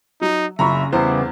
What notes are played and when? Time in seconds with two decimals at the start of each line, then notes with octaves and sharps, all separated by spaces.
0.21 F#3 D#4
0.59 F#1 C#3 E5 A#5 B5 C#6
0.93 E2 C#3 G3 B3 E4 C5